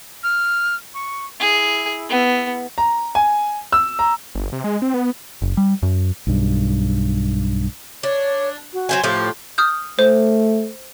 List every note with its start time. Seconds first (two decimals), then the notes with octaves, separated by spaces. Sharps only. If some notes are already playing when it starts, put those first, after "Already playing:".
0.23 F6
0.94 C#6
1.40 E4 G#4
2.09 B3
2.78 A#5
3.15 G#5
3.72 E6
3.99 A#5
4.35 G1
4.52 C3
4.64 G#3
4.82 C4
4.94 B3
5.42 F#1
5.57 G3
5.83 F#2
6.27 B1 G2
8.03 D4 C#5
8.73 F#4
8.89 F#3 C5 G#5
9.04 A2 F3 G4 C6
9.58 D#6 F6 G6
9.99 A3 C5